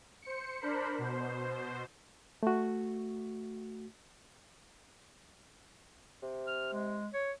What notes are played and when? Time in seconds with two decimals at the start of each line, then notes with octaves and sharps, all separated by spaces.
0.22 C5 C#7
0.60 D4 A#4 C5 B5
0.98 B2 C5
2.43 A3 F#4
6.23 C3
6.47 F6
6.73 G#3
7.13 C#5